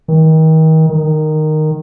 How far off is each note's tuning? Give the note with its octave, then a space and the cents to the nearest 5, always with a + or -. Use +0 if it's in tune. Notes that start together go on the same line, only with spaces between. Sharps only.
D#3 +35
D#3 -10